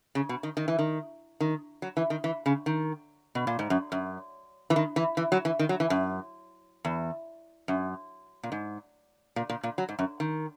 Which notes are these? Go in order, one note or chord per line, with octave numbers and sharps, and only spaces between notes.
C#3
B2
D#3
D#3
E3
D#3
D#3
F#3
E3
D#3
E3
C#3
D#3
B2
A#2
G#2
F#2
F#2
E3
D#3
E3
E3
F#3
E3
D#3
F#3
E3
F#2
E2
F#2
A#2
G#2
A#2
A#2
A#2
F#3
G#2
F#2
D#3